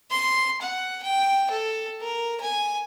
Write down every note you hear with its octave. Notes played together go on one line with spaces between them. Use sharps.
C6
F#5
G5
A4
A#4
G#5